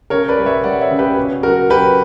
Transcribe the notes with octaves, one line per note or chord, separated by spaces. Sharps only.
C#3 A#4 C#5
B4 D5
G3
C#5 E5
G3 D5 F#5
C#5 E5
C#3
G4 B4
B2
F#3 F#4 A#4
F#3 G4 B4